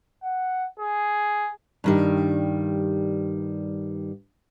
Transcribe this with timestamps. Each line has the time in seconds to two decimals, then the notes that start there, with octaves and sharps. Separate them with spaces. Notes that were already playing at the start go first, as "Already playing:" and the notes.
0.23 F#5
0.80 G#4
1.84 G2 D#3 G3